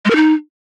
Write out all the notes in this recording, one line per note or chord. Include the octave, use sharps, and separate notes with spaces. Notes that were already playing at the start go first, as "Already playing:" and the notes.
G#3
A#4
D#4